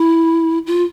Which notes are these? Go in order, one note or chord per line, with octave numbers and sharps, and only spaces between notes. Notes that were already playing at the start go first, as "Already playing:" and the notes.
Already playing: E4
F4